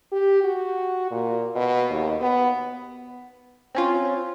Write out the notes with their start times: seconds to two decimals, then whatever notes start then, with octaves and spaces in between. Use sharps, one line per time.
0.12 G4
0.44 F#4
1.11 A#2
1.55 B2
1.90 D#2
2.21 B3
3.75 C4 C#4 F4